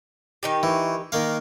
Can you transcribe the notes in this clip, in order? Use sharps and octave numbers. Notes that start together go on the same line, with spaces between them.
D#3 D#4 G4
E3
D#3 A#3 F5